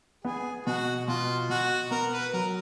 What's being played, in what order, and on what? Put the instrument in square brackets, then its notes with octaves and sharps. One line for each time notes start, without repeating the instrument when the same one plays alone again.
[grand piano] B3 [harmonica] G#4
[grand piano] B2 [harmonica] F#4
[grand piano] B2 [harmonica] F4
[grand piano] B2 [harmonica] F#4
[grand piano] B3 [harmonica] A#4
[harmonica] B4
[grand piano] F#3 [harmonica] A#4